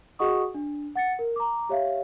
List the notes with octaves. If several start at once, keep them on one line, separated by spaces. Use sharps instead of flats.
F#4 G#4 D#5 F#5 C#6 D#6
D4
F#5 A6 C#7
A#4
A#5 D6
G4 C#5 E5 F5